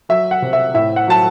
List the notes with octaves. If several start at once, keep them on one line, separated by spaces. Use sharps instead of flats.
F#3 E5
F#5
C3
E5
A2 E5
F#5
F#3 A5